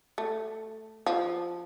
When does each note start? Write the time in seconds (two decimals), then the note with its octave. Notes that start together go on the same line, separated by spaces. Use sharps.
0.18 A3
1.06 F3